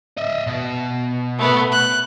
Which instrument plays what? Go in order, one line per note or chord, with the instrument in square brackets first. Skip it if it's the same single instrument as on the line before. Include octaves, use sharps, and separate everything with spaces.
[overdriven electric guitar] D#5 E5
B2
[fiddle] A3 B3
F#6